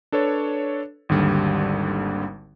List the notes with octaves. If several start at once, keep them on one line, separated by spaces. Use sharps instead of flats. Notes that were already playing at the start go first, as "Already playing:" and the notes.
D4 A4 B4 C#5
G#1 D#2 D3 G3